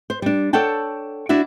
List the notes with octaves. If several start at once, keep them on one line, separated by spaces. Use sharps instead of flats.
C5
G3 D4
A4 C#5 D5 F#5 G5 A5
D4 E4 F#4 E5